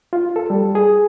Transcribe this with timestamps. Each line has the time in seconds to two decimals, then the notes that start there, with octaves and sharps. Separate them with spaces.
0.13 F4
0.36 A4
0.50 G3
0.75 G#4